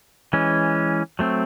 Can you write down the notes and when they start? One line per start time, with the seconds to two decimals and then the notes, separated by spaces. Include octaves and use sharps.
0.33 E3 G#3 C#4
1.19 F#3 A3 C4